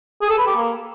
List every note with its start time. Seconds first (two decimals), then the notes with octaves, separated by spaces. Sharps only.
0.22 G#4
0.30 A4
0.39 B4
0.47 G4
0.55 A#3